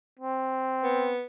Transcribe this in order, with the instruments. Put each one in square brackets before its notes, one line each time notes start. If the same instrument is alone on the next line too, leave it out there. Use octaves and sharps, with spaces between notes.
[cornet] C4
[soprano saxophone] B3